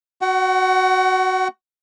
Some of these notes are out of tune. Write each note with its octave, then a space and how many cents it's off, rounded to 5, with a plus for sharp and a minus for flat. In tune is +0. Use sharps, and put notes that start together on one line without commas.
F#4 +0 F#5 +35